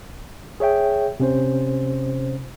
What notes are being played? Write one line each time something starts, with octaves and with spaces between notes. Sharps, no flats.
G#4 C#5 E5 G5
C3 C#4 C5